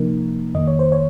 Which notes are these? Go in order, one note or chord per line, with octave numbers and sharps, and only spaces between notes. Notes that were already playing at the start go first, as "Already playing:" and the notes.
Already playing: C3 F3 A#3 D#4 A#4
F2 D#3 A#3 D#5
C#5
C5
C#5